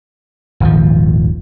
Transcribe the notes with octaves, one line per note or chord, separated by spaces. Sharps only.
D#1 G#1 F3